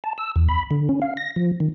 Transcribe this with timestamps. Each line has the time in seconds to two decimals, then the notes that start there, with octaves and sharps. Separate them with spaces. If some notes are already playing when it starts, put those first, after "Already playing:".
0.04 A5
0.18 E6
0.36 E2
0.49 B5
0.71 D3
0.89 C#4
1.02 F5
1.17 A#6
1.36 F3
1.60 D#3